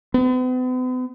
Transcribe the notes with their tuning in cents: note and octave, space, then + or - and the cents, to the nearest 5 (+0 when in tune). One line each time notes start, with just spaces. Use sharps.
B3 +45